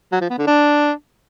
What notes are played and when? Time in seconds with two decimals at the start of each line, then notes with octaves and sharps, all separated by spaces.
0.12 F#3
0.21 F3
0.30 B3
0.38 D3
0.47 D4